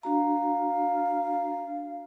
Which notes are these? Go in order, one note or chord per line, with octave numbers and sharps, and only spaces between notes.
D4 F#4 F5 A#5